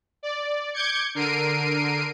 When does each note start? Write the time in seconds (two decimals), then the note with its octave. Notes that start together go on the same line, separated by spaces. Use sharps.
0.23 D5
0.74 D6 G6 G#6 C#7
1.15 D3 A#4 C7 D7 D#7